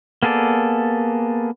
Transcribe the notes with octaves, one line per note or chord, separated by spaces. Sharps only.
A#3 B3 G#4 A4 D5